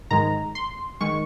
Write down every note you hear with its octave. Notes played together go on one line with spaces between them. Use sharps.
G#2 D#3 G#3 A#5
C6
D#3 G#3 C#6